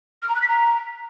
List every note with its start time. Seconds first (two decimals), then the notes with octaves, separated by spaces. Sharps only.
0.22 F6
0.28 A#5
0.35 F#6
0.41 B6
0.48 A#5